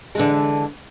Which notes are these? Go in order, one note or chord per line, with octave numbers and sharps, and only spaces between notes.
D3 E3 G#3